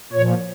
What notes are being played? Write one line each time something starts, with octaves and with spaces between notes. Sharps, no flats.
A#2 C#5
F3